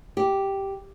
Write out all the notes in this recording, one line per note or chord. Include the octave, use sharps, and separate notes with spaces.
G4